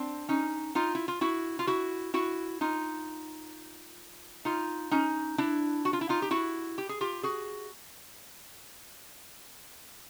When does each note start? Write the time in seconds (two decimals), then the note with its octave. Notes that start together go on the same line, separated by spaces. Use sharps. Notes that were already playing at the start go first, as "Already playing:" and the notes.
Already playing: C4 D4
0.29 C#4 D#4
0.75 D#4 F4
0.95 E4
1.08 F4
1.21 E4 F#4
1.59 F4
1.67 E4 F#4
2.14 E4 F#4
2.61 D#4 F4
4.45 D#4 F4
4.91 C#4 D#4
5.38 D4 E4
5.85 F#4
5.93 F4
6.01 E4
6.09 D#4 F4
6.22 G4
6.31 E4 F#4
6.78 G4
6.89 G#4
7.01 F4 G4
7.23 F#4 G#4